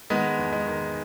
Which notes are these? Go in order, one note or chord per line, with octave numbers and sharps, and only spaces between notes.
D#3 G#3 B3
E2
G#3
D#3